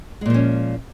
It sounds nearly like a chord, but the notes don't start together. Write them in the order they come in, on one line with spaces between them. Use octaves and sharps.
G#3 A#2 F3 C#4